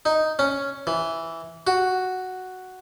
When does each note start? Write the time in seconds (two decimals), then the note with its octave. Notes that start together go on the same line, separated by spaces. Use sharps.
0.05 D#4
0.39 C#4
0.87 E3
1.67 F#4